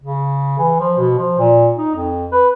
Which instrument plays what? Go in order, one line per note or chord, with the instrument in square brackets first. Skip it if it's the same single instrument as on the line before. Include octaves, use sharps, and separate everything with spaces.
[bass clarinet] C#3
E3
F3
B2
F3
A#2
D#4
F2
B4